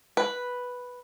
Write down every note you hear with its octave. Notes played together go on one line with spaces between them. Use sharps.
B4